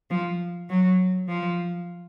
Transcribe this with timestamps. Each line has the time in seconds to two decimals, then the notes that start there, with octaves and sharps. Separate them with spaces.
0.10 F3
0.69 F#3
1.28 F3